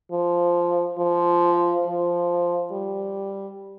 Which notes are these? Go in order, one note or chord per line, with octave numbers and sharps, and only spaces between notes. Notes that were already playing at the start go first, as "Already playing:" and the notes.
F3
F3
F3
G3